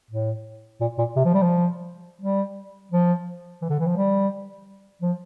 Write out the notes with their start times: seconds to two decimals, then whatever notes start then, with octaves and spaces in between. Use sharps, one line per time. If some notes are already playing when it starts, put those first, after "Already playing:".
0.10 A2
0.81 A#2
0.98 A#2
1.16 C3
1.25 F3
1.34 G3
1.42 F3
2.21 G3
2.91 F3
3.62 E3
3.70 D3
3.79 E3
3.87 F3
3.96 G3
5.01 F3